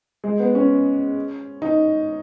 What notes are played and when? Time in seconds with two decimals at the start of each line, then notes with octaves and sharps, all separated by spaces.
0.24 G#3
0.40 B3
0.55 C#4
1.62 D#4